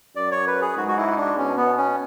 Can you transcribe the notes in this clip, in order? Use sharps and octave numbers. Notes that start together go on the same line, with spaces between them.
F#2 D5
C#5
B4
G#4
G#2 F#4
F#4
E4
D4
B2 C#4
B3
C#4